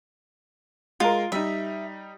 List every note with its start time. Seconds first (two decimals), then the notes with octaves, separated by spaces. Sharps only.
1.00 G#3 F4 A#4
1.32 G3 D#4 E5